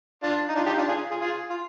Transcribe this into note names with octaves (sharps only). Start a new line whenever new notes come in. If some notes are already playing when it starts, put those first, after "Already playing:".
D4 F4
D#4
D4 F4
D#4 G4
D4 F4
F4 G#4
F4 G#4
F4 G#4
F4